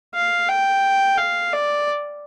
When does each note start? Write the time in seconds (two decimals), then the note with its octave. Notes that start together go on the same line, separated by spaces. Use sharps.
0.15 F5
0.48 G5
1.17 F5
1.53 D5